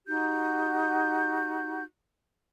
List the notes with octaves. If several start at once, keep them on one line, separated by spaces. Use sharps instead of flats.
D#4 F#4 G4 G6